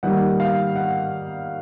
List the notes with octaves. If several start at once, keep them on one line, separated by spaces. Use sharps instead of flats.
D#3 G3 A#3 F#5
F5
F#5